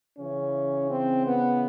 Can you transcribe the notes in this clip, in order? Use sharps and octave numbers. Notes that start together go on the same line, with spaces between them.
C#3 E3 C#4
C4
B3